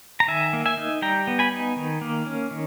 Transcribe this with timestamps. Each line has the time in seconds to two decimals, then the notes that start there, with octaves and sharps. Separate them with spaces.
0.20 A#5
0.28 D#3 E5 G#5
0.53 A#3
0.66 E5 G#5
0.77 D#4
1.02 G3 G5 A#5
1.27 B3
1.39 G#5 B5
1.52 D#4
1.76 D#3
2.01 A#3
2.26 C#4
2.51 D#3